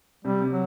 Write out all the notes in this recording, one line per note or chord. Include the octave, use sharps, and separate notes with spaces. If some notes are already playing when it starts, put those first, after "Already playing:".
C3 G3
C3
F#3